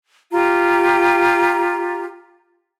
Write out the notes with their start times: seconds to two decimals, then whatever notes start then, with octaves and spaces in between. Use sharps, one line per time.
0.32 F4 G4 A#5